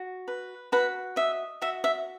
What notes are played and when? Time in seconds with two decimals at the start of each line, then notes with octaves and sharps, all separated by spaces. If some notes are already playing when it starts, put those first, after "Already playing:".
Already playing: F#4
0.28 B4
0.72 F#4 B4 B5
1.16 D#5 E5
1.62 F#4 E5
1.84 E5